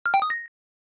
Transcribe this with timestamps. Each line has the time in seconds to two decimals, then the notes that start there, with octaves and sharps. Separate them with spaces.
0.06 F6
0.14 G5
0.22 D#6
0.30 A#6